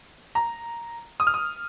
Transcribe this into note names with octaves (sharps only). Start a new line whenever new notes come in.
A#5
D#6
F6
D#6